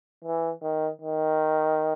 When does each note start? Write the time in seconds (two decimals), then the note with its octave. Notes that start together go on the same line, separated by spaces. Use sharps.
0.25 E3
0.62 D#3
1.01 D#3